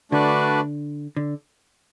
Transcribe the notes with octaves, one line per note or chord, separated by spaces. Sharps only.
D3 A3 D4 F#4 B4 D5
D3